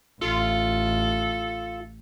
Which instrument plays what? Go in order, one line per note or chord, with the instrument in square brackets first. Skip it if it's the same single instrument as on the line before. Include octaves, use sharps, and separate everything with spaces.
[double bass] A1 [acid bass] F4 [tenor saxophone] A4